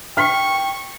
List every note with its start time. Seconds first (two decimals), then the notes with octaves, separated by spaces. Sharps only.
0.17 G5 C#6 F6 B6